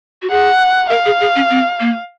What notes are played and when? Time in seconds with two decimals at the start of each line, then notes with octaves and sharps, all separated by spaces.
0.22 F#4
0.30 G#4 F#5
0.90 A#4 F5
1.06 G#4
1.21 G#4
1.36 C#4
1.50 C4
1.80 A#3